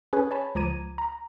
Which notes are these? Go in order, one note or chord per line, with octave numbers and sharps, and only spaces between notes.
C#4 G#4 B4 C#5
C#5 G#5 A5 B5
C#2 F3 A#5 D6 G#6 D#7
A#5